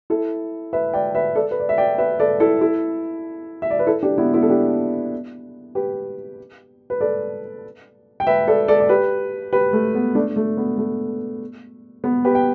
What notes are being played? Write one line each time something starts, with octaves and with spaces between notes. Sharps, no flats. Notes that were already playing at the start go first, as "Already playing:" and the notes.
E4 A4
B4 E5
D5 G5
B4 E5
A4 D5
B4
D5
E5
D5 G5
B4 E5
A4 D5
E4 A4
E4 A4
E5
D5
B4
E4 A4
D4 G4
B3 E4
B3 E4
A4
D4 G4
G4 B4
B4
A4 D5
G5
B4 E5
A4 D5
A4 D5
D5
G4 B4
G4 B4
A3
B3
A3 D4
A3
B3
A3
B3
G4 B4
G5